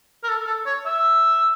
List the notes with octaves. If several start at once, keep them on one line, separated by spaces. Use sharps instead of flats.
A#4
A4
A4
C#5
E5